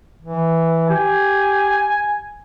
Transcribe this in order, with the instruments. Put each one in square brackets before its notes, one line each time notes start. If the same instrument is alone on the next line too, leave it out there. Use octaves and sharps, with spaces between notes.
[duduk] E3
[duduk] G4 [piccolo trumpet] G#5